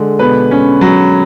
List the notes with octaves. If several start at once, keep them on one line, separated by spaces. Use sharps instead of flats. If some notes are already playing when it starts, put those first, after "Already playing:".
Already playing: D3 G#3
B2 B4
C#4
F#3